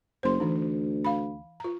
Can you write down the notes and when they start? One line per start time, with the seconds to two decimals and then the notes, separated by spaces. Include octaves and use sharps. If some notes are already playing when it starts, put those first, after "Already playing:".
0.23 F#1 C5 C6
0.40 D2 E3 D#4
1.05 F5 B5
1.60 F4 A#5